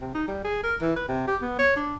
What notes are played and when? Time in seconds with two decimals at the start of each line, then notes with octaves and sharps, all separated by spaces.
0.01 C3
0.14 D#4
0.28 G3
0.44 G#4
0.63 A#4
0.81 E3
0.96 B4
1.08 C3
1.28 G4
1.42 B3
1.59 C#5
1.76 D4